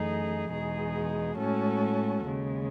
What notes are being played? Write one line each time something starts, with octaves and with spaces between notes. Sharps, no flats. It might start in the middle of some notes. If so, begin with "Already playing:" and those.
Already playing: F#2 E3 A3 D#4 G#4
E2 B2 G#3 D#4 G#4
A2 G#3 C#4 F#4 A4
D#2 C#3 G#3